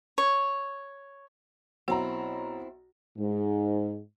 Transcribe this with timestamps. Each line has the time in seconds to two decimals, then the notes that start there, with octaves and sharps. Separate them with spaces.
0.18 C#5
1.88 B1 C4 E4 F#4 F#5 A#5
3.18 G#2